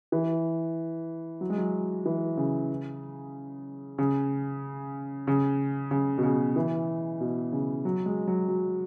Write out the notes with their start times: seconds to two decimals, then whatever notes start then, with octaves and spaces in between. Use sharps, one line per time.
0.12 E3
1.41 F#3
1.50 G#3
1.58 F#3
2.05 E3
2.37 C#3
3.98 C#3
5.27 C#3
5.91 C#3
6.18 B2
6.23 C#3
6.56 E3
7.20 B2
7.53 C#3
7.85 F#3
8.06 G#3
8.27 F#3
8.48 F#3